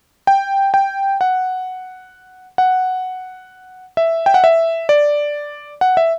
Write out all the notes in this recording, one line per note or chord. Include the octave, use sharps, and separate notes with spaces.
G5
G5
F#5
F#5
E5
G5
F#5
E5
D5
F#5
E5